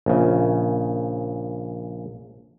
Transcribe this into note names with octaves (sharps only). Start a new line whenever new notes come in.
A#1 C#3